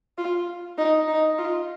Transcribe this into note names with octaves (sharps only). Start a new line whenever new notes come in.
F4
D#4
D#4
F4